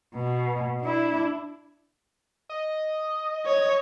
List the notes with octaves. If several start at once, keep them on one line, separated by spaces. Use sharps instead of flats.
B2
D4 E4
D#5
C#5